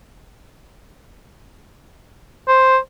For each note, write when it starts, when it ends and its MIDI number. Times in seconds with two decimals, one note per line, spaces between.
2.48 2.78 72